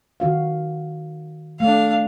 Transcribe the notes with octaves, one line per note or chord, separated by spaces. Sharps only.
D#3 F#4 F5
A3 D4 F5